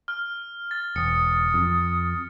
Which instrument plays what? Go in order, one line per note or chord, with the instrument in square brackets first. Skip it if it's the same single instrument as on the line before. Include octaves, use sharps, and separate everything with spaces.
[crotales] F6
A6
[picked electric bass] E1 [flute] D#6 [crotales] C#7
[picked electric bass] F2